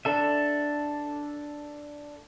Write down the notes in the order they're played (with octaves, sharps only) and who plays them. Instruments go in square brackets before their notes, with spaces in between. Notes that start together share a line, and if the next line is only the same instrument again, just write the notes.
[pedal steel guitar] D4 A4 E5